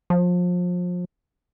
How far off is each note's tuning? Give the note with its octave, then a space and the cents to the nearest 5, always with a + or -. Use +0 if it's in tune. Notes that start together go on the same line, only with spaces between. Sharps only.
F3 +30